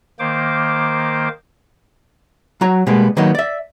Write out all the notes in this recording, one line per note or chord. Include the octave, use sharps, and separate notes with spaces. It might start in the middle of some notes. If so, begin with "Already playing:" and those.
D#3 A#3 C5 D6
F#3 F#4 C#5 A#5
B2 G3 G#3 A#3 B3
D#3 F#3 A#3 B3 D#4
D5 E5